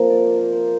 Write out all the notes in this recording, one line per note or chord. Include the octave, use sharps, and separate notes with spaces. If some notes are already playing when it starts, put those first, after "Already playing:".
Already playing: C3 F3 A#3 A#4
D5
C5
A#4
C5